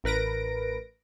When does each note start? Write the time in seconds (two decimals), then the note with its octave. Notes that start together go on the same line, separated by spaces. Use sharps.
0.04 A1 A#4 B4 A#6 D7